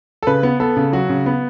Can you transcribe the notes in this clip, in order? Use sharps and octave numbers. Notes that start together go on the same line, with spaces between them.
A4
C#3 B4
B3
B3 A4
C#3
F#3 F#4
C#3
B3